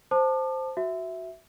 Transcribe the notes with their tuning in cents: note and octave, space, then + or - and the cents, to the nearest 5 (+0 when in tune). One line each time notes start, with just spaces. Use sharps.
C5 +0 A5 +0 D6 +40
F#4 +0 E5 +0